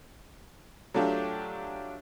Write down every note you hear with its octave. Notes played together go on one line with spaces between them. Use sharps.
F#3 A3 D4 F4 G4